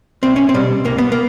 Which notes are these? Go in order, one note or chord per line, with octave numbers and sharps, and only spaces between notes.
C2 C4
C#4
C4
B2 G3
C2 A#3
B3
A#3